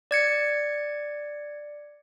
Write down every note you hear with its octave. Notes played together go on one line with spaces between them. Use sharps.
D5 G#6 C#7